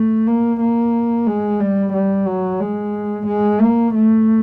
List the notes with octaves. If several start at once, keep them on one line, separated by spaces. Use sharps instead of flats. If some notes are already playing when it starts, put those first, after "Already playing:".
Already playing: A3
A#3
A#3
G#3
G3
G3
F#3
G#3
G#3
A#3
A3